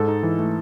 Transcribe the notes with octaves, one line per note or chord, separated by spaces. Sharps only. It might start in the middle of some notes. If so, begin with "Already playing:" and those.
Already playing: G#2 A4
D#4
E3
A3